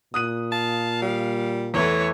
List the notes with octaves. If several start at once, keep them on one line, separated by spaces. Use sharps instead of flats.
A#2 D#6 F#6 D#7
F5 A5
G3
E2 E3 A3 C#5